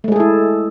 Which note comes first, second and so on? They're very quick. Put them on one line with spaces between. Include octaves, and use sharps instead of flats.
A3 G#3 G#4 A4 E4